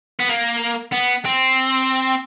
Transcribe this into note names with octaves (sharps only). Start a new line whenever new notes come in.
B3
A#3
B3
C4